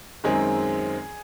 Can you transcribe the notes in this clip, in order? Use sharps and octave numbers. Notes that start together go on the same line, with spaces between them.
F#2 D#3 G#3 C4 G#4